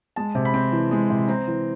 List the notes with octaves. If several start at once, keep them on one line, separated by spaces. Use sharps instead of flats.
G#3 A5
C3
B5
C4
E3
G#3
C3
C4 A#5
E3